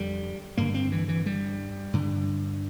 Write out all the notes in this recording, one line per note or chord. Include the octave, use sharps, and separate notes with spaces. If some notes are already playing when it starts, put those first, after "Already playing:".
Already playing: F2 D3 G3
G2 D3 A#3
C4
E3
E3
G3
G2 D3